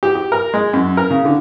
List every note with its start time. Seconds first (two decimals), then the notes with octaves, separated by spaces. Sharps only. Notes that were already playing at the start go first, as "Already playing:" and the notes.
0.03 G4
0.15 G4
0.32 A#4
0.54 G#3
0.73 F#2
0.97 A#4
1.10 C#3
1.25 D3